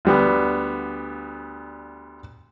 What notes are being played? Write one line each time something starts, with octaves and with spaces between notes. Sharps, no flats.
D2 G3 B3